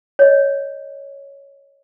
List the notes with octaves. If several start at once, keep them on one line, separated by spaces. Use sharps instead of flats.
C#5 D#5